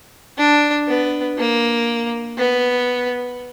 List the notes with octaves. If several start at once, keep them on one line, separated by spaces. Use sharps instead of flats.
D4
B3
A#3
B3